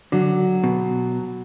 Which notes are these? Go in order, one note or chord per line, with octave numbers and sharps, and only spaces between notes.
D3 F#3
B2